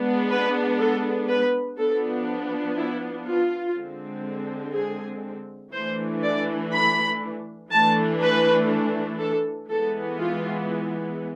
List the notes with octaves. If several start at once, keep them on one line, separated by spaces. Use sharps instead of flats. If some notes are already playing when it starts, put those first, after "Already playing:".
Already playing: G#3 B3 D4
B4
A4
B4
F3 B3 D4 A4
E4
F4
D3 G#3 C4
G#4
E3 A3 D4 C5
D5
B5
E3 A3 D4 A5
B4
A4
E3 G#3 B3 A4
F4